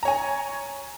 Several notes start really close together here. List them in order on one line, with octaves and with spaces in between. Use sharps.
A#5 C#5 G#5